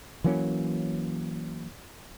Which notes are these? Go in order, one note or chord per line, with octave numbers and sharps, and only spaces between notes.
E3 F#3 A#3 C#4